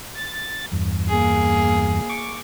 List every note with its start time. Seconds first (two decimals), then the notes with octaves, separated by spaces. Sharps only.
0.15 A6
0.72 E2 G2
1.09 A#3 G#4
2.09 C#6 D6